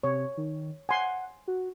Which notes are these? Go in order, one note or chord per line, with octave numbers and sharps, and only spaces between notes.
C3 C#5
D#3
F#5 G#5 C6
F#4